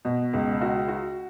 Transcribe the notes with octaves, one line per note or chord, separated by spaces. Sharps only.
B2
C#2
F#4
F#4